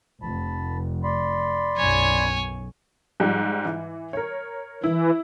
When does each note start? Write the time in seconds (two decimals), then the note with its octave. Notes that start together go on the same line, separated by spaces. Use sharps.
0.22 F1 A5 B5
1.03 D5 B5 C6
1.78 B1 F#2 C#5 G#5
3.20 G#2 F3 G3
3.65 E3
4.13 A#4 C#5
4.84 E3 E4